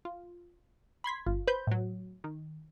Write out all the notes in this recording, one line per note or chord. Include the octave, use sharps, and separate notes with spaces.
F4
B5 C6 G#6 B6
G1 F4
B4 C5 B5 G6
A2 F#3
D#3